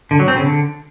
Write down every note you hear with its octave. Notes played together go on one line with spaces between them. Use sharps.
D3
F#3
C4
C#3
D3